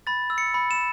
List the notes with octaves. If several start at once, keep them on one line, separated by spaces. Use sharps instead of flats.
B5 A6
E6
C#7
B5
E7